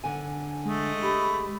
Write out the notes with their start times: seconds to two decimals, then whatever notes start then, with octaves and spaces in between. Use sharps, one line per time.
0.04 D3 G#5
0.65 G#3 A3 D#5
1.02 G4 B5